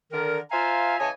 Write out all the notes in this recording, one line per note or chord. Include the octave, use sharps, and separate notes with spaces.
D3 D#3 A#4
F4 C5 E5 F5 G#5 A#5
C#3 E3 C#5 D#5 G#5 A5